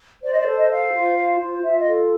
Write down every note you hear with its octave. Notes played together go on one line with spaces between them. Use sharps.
C5 D5
D#5
D5
A4
D#5
C5 F5
F4
C5
F4
F4 E5
D#5
A4